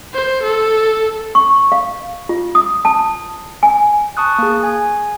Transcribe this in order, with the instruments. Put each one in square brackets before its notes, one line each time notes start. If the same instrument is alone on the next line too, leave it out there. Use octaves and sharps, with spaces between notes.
[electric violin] C5
A4
[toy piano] C#6
F5
F4
D#6
A5
G#5
[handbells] A5 C#6 D#6 F#6
A#3 G#4
G#5